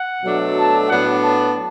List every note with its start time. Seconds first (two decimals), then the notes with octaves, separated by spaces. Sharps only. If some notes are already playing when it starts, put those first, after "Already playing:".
Already playing: F#5
0.23 B2 F#3 A3 D4
0.56 A5
0.88 A2 F#3 B3 D4 F#5
1.22 A5